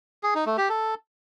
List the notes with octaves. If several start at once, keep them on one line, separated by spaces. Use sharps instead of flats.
G#4
D#4
A3
G4
A4